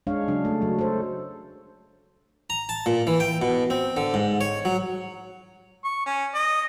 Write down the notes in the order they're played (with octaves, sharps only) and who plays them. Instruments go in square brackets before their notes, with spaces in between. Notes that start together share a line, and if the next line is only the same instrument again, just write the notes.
[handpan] G#3 D4 C#5 F5
C#3 F#3 D4
A3
F#3
A4 C5
[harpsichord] A#5
A5
A#2
E3
G5
B2
C4
D3
G#2
C#5
F#3
[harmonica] C#6
C#4
D#5